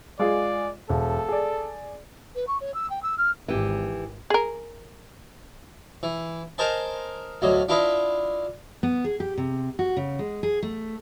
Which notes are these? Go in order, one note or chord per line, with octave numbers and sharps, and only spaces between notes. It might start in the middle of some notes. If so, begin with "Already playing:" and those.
G#3 F4 G#4 D5
E1 A4
G#4 D5
B4
C#6
C#5
E6
G5
E6
F6
G#1 E3 G4
G#4 A#4
E3
A#4 C5 D#5 G#5 A5
D2 A2 F#3 D#5
D4 E4 F4 B4 D#5
B3
G#4
G4
C3
F#4
C#3
G#3
G#4
A3